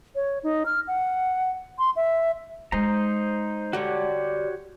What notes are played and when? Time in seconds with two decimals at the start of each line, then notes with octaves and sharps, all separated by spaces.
0.15 C#5
0.43 D#4
0.66 F6
0.87 F#5
1.78 C6
1.96 E5
2.72 G#3 D#4 C5 A#5
3.73 D3 G3 F#4 G4 C#5